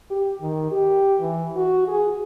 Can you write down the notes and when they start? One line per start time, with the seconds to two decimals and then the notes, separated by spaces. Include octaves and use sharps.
0.10 G4
0.41 D#3
0.71 G4
1.20 E3
1.56 F#4
1.88 G#4